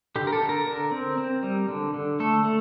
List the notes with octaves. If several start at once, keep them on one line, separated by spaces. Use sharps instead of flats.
D3 G4
A#4
A4
D3
A#4
D3 A#4
C4
C4
G3
D3
D3
A3 A4
A3